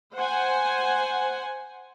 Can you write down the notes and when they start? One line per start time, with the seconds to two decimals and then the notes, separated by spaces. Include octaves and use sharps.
0.15 C5 F#5 G#5